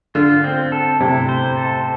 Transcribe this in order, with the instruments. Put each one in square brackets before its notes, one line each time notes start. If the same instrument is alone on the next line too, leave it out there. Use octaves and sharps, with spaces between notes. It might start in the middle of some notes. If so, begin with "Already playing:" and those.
[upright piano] D3 [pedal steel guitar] F4
[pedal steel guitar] C4
A4
[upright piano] C3 [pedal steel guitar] E4
[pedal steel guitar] C5
A4